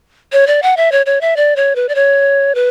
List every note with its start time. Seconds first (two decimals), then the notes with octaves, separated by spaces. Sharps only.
0.32 C#5
0.47 D5
0.62 F#5
0.77 E5
0.92 C#5
1.06 C#5
1.21 E5
1.36 D5
1.56 C#5
1.76 B4
1.89 D5
1.95 C#5
2.55 B4